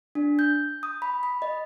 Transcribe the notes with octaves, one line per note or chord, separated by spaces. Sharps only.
D4
G6
D#6
B5
B5
D#5